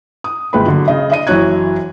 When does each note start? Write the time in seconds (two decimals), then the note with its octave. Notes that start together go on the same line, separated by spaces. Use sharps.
0.24 D#6
0.53 G1 A#2 G#3 B4 G5 B5
0.66 D3 F#3
0.88 C#3 D#5
1.10 D4 D#5 D#7
1.27 F#1 E3 F#3 C#5 F#6 G#6